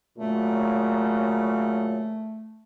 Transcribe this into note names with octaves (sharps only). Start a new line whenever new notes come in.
A#2 C#3 F#3 A3